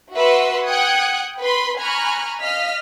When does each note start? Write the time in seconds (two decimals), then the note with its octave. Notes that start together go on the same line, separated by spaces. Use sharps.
0.16 F#4 B4 E5 F#5 C6 E6
0.67 F#5 G5 D#6 F#6 G#6 C#7
1.40 B4 B5 C6
1.79 G#5 A#5 B5 C#6 F6 F#6
2.41 D#5 F5 F6 B6